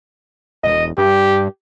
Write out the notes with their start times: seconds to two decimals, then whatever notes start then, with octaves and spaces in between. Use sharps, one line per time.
0.64 E1 D#5
0.98 G2 G4